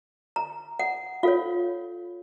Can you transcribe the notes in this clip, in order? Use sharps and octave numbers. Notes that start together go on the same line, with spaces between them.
A#5
F#5
F4 A4 C#5 F5